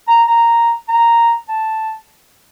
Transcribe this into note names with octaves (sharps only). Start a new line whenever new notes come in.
A#5
A#5
A#5
A5